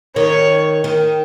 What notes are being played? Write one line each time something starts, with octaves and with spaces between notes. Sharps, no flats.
D#3 C#5
D#3